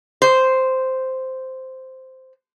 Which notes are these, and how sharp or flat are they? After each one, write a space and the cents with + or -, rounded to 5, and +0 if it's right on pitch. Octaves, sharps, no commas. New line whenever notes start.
C5 -5